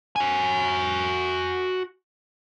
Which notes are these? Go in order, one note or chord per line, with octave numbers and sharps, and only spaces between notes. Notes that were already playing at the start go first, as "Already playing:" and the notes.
F#4 G#5